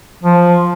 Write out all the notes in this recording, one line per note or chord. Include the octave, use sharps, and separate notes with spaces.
F3